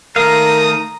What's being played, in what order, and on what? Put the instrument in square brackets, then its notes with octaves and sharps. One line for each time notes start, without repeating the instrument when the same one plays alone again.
[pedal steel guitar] D#3 A3 F5 [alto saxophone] A#4 [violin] A#5 [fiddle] D#6